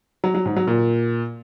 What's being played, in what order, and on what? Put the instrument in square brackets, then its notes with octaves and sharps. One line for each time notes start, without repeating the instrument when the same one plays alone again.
[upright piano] F#3
F#3
G#2
F#3
A#2